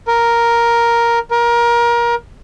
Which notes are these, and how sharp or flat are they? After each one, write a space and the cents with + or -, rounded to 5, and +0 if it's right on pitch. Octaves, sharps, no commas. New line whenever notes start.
A#4 +5
A#4 +25